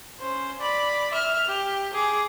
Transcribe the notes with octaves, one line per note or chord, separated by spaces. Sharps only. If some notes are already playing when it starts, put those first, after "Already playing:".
C#4 C5
D5 B5
E5 F6
G4
G#4 D6